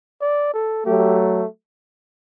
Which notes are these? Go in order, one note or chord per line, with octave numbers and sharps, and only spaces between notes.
D5
A4
F#3 A3 G4